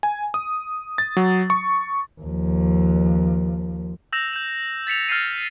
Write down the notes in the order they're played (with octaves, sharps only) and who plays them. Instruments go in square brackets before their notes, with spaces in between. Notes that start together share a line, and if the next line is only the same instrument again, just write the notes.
[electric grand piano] G#5
D#6
A6
F#3
C#6
[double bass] D#2 F3
[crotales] E6 G6 A#6 E7 F7
G6 E7
A6 B6 C#7 F7
F6 G6 A6 C7 D#7